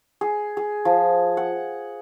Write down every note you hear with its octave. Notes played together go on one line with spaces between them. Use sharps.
G#4
G#4
F3
F#5